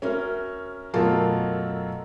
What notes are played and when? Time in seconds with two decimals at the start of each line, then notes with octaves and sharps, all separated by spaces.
0.02 C#4 F#4 A#4 E5
0.94 F#2 B2 A3 F4 A#4 A5